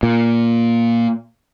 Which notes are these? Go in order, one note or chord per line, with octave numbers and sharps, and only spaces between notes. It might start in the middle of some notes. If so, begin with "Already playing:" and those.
A#2